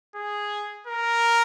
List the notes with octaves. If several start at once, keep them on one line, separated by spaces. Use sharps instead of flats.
G#4
A#4